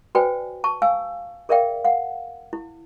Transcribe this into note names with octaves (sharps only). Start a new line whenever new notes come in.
F#4 B4 C5 D5 G5 G#5
A5 C#6
F5 G#5 E6
G#4 A#4 D5 E5 F5 G5
F5 F#5
E4